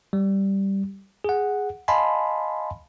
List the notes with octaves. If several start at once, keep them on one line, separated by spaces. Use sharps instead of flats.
G3
G#4 F#5
D#5 F5 G#5 A5 B5 C6